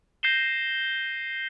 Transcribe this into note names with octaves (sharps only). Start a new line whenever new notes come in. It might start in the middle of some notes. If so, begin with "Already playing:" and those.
G6 A#6 C7 D#7 E7 G7